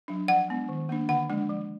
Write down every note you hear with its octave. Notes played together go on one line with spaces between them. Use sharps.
F#3 D4
F3 F#5
G#3 B3 D4
D#3
A#3 D4
D3 F#5
F3 G#3 D4
F3